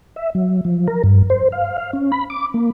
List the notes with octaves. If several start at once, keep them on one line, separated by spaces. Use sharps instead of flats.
E5
F#3
F3
A#4
G2
C5
F5
F5
C#4
B5
D6
A#3